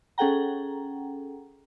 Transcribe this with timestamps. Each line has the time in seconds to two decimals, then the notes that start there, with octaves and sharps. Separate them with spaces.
0.18 C#4 G#4 A4 F#5 G5 A#5